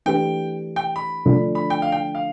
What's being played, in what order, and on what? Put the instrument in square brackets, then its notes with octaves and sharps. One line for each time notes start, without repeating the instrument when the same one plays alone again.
[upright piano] E3 A3 D4 G4 B4 [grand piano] G5
[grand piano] G5
B5
[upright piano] D3 F3 A3 D4 F4
[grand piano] B5
G5
F5
G5
F5